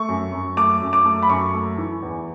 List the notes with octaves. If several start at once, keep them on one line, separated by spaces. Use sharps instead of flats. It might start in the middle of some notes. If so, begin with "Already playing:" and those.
Already playing: A3 C#6
F#2
F#2
A3 D6
F#2
D6
A3
B5
F#2 C#6
A3
E3
E2